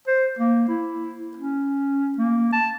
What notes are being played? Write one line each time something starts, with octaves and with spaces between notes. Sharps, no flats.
C5
A#3
E4
C#4
A#3
A5